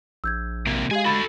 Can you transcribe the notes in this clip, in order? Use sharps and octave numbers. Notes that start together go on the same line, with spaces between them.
A#1 E6 G6 G#6
C3 A#3
G#3 G4 G#4 F5 G#5
F#4 A4 B5 A6